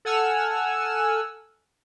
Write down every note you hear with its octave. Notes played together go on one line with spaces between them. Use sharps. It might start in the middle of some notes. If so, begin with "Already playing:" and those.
A4 F#5 G#5 E6 F6